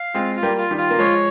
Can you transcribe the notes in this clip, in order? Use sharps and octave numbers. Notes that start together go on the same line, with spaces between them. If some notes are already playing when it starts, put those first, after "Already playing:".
Already playing: F5
G#3 C4 F4
F4
G3 A#3
F4
D#3 G3
F4
A#3
F3 G#3 C#5